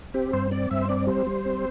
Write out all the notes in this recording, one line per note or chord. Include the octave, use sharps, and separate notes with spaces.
C4 G4
G2 C5
C4 D5
G2 E5
C5
C4 D5
G3 C5
G3
C4